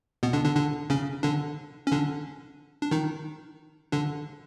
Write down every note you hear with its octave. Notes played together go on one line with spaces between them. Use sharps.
B2 B3
D3 D4
D3 D4
D3 D4
C#3 C#4
D3 D4
C#4
D3 D4
D4
D#3 D#4
D3 D4